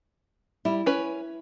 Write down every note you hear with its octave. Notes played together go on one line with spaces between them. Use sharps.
G3 E4
C#4 B4